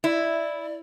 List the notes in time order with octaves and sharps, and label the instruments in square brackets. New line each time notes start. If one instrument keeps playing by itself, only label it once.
[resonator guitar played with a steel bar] E4 [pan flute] D5